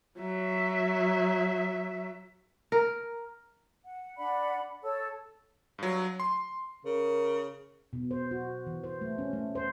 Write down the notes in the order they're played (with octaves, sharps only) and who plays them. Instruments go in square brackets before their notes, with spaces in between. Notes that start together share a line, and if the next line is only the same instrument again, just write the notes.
[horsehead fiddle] F#3 E5
[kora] A#4
[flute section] F#5
D4 D5 F#5 B5
A4 C#5 A5 E6
[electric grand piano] G2 F#3
C6
[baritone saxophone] C#3 [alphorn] A#4
[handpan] B2
C5
F#4
E3
C5
A3
C#4
A3
C5